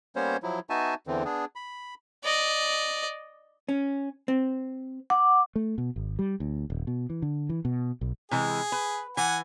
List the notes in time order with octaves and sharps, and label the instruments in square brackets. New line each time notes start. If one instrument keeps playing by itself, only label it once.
[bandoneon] G3 A#3 B3 C#4 C5 C#5
F3 F#3 E4
B3 D#4 F#4 E5 G#5 A5
E2 D3 E3 C4
B3 D4 G#4
B5
[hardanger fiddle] D5 D#5
[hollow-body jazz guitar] C#4
C4
[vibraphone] F#5 D6
[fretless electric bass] A3
B2
G#1
G3
D2
D#1
B2
E3
D3
E3
B2
B1
[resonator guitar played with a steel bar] C3 E3 G#3 [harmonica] G#4
[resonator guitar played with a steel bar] B4
[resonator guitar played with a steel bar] E3 [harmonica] F#5 G#5